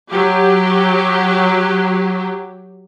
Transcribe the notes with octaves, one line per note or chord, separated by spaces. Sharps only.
F#3 G4